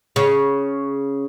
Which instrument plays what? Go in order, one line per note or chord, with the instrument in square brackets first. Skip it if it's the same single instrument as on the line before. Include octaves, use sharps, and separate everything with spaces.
[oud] C#3